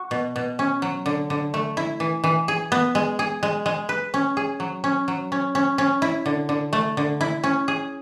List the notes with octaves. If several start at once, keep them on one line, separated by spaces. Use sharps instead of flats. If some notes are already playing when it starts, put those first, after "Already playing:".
Already playing: F#4
B2
B2
C#4
F#3
D3
D3
A3
E4
E3
E3
G#4
B3
G#3
G#4
G#3
G#3
B4
C#4
G#4
F#3
C#4
F#3
C#4
C#4
C#4
E4
D3
D3
A3
D3
E4
C#4
G#4